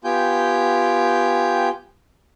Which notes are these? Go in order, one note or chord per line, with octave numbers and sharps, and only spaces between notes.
B3 F4 G4 G5 G#5 G6